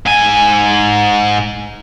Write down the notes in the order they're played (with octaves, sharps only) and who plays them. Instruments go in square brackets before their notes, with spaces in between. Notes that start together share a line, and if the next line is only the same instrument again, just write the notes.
[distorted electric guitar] G#2 G#5